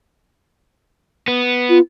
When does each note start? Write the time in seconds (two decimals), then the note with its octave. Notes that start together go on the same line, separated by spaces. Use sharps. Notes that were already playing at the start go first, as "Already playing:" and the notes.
1.28 B3
1.69 F4